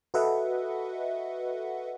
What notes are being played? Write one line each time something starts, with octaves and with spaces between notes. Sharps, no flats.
F#4 A4 B4 D#5 E5 F#5